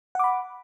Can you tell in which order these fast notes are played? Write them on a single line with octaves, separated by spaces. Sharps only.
F#5 D6 B5